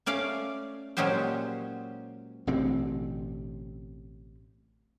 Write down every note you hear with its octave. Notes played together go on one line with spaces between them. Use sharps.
A3 C#4 D5 F5
A#2 F#3 G#3 C#4 G4 C5
A1 B2 D3 C4